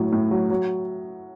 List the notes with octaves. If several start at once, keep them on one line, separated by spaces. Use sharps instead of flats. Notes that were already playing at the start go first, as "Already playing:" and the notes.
Already playing: A2 F#3
A2
F#3
F#3